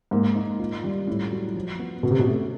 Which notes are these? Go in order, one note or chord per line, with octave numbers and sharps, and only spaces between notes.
G#2 A#3
D#4
F4
G3
A2 E4
F#3
F3
B3
B2 C#4
C3
B2
A3